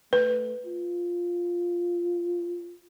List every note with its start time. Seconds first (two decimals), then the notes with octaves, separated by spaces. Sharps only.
0.13 A3 B4
0.65 F4